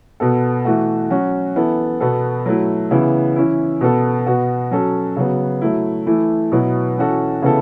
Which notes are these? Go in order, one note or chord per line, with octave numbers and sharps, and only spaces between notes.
B2 B3 A4
E3 A3 F#4
F#3 C#4 F#4
E3 B3 E4 A4
B2 B3 A4
F#3 A3 E4
C#3 E3 B3 E4
E3 C#4 E4
B2 B3 A4
B2 B3 F#4
F#3 C#4 A4
C#3 F#3 B3
F#3 A3 E4
E3 A3 E4
B2 F#3 B3 E4
E3 C#4 F#4 A4
C#3 E3 B3 E4 A4